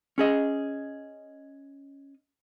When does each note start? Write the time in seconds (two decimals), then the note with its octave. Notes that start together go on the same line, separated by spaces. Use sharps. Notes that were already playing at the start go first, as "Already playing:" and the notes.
0.18 C#4 G#4 D#5